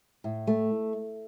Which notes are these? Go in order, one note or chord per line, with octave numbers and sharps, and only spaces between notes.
A2
A3